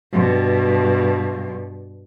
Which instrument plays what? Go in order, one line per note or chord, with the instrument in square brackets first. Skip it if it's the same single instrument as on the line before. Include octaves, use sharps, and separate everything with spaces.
[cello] G2 B2